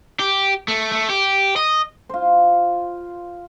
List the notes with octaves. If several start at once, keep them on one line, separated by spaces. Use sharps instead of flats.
G4
A3
A3
G4
D#5
F4 C5